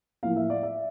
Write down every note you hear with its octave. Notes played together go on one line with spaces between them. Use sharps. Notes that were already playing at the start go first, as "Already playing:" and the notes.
A2 F3 A#3 E4 F5
E5
D5
E5